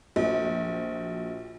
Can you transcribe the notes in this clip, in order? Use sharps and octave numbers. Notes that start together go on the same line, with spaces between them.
A#1 F3 F#3